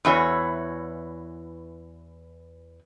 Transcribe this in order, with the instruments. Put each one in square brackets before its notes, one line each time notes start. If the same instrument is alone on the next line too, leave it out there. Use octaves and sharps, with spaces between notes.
[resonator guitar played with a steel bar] E2 E3 F#4 C#5